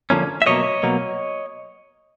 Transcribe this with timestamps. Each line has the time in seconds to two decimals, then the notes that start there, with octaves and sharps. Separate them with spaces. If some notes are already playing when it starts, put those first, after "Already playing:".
0.10 D3 F3 A#3 C#4
0.42 E5
0.46 B2 F#3 A#3 C#5 D#5
0.83 B2 F#3 A#3